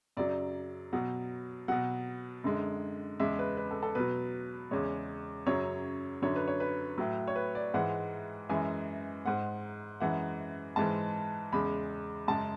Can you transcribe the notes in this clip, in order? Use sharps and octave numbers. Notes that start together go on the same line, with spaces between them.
F#2 C#3 F#3 D5
B2 F#3 F#5
B2 F#3 F#5
F#2 D3 G#3
E2 C#3 G#3 E5
B4
B4
A4
A4
B2 F#3 B4
E2 C#3 G#3 C#5
F#2 C#3 F#3 C#5
F#2 D3 F#3 C#5
B4
C#5
B4
A2 F#3
C#5
B4
D5
G#2 E3 G#3 F#5
F#2 E3 G#3 G#5
G#2 G#3 F#5
F#2 E3 G#3 F#5
G#2 E3 G#3 A5
E2 C#3 G#3 B5
F#2 C#3 G#3 A5